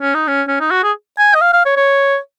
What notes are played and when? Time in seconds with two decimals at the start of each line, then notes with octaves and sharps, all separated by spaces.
0.02 C#4
0.15 D#4
0.28 C#4
0.48 C#4
0.61 D#4
0.71 F#4
0.83 G#4
1.19 G#5
1.35 D#5
1.41 F5
1.53 F5
1.66 C#5
1.77 C#5